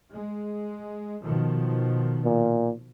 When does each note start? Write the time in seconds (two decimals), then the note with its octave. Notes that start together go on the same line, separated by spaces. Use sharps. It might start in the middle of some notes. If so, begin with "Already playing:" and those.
0.14 G#3
1.23 B2 D#3 F3
2.24 A#2